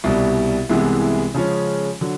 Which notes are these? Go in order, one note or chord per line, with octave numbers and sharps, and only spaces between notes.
C2 B2 G3
C2 C3 E3 G#3 B3
C#3 F3 G#3 C#4
D3 F#3